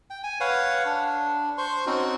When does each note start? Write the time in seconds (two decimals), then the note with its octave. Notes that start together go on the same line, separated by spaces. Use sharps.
0.10 G5
0.24 G#5
0.40 B4 C#5 F5 F#5
0.85 D4
1.58 C5 C6 C#6
1.87 C4 C#4 D#4 F#4